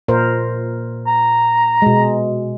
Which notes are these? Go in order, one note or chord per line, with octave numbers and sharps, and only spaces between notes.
A#2 A#4 C5
A#5
B2 G#3